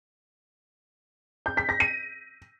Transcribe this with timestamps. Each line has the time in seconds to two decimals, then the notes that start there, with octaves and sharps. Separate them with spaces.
1.46 G6
1.57 B6
1.69 A#6
1.80 D#7